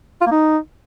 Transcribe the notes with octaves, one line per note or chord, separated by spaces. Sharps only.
F4
A#3
D#4